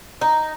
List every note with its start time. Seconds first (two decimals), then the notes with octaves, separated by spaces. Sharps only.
0.21 D#4